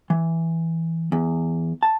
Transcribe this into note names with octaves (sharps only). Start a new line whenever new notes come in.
E3
E2
A5